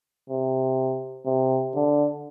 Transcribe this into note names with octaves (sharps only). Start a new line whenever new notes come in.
C3
C3
D3